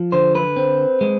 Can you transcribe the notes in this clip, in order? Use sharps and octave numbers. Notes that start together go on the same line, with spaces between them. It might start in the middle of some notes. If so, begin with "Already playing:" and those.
Already playing: F3
D3 C5
B4
C4
G#3